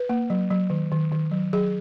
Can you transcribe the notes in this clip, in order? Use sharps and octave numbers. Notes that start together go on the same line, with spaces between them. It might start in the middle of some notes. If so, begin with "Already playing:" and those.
Already playing: B4
A#3
F#3
F#3
D#3
D#3
D#3
F#3
F#3 G#4